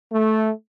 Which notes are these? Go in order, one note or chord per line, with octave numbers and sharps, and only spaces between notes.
A3